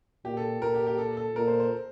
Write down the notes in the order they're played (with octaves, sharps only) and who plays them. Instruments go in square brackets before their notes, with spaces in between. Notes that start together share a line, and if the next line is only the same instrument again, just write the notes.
[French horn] A#2 [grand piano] G4
[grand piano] A4
[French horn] A#2 [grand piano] A#4
[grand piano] G4
G4
A4
A4
[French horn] A#2 [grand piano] A#4
[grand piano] C5
C5